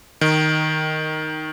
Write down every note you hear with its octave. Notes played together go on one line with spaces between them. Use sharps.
D#3